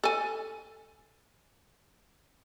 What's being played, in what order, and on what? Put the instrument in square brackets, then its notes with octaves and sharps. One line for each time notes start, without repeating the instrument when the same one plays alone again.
[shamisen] A4 G#5